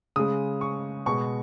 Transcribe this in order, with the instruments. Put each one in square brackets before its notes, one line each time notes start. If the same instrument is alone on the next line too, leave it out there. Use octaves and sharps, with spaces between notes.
[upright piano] C#3 G#3 D#6
C#6
B2 G#3 C#6